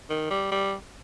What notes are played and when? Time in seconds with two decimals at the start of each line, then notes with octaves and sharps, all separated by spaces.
0.10 D#3
0.30 G3
0.51 G3